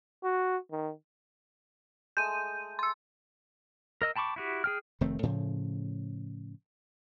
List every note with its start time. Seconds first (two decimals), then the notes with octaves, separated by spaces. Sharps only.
0.23 F#4
0.71 D#3
2.17 G#3 A3 D#6 G6 D#7
2.79 C6 E6
4.02 A#4 D#5 E6
4.16 G5 A5 B5 C#6 D6
4.36 E4 F#4 G4
4.64 G#4 G5 F6
5.01 F1 D#3 A3 C4
5.23 A2 C#3 F3